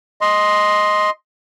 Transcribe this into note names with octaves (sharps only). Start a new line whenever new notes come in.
D#5 C6